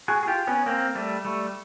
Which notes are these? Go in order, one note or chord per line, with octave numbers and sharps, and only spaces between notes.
F#4 G#4
G#4
F4 G4
B3 C#4
A#3 C4
G3 A3
G3 A3